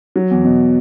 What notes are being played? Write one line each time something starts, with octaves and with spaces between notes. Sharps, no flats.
F#3
E2
B2